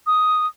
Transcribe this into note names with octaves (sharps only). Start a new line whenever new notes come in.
D#6